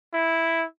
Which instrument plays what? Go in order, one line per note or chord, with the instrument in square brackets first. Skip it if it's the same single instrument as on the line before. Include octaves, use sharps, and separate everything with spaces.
[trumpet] E4